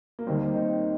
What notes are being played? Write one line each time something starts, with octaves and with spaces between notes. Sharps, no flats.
A#3
D#2 D#3 G3 C4
D#4